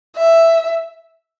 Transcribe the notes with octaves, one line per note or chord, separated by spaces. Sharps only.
E5